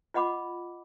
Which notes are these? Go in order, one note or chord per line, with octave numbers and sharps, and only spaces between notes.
F4 D#5 F#5 B5 D6